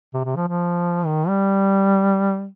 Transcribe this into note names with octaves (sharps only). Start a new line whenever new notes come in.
C3
C3
F3
F3
D#3
G3